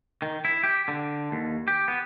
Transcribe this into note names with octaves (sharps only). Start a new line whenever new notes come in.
D#3
E4
G4
D3
D#2
G4
B3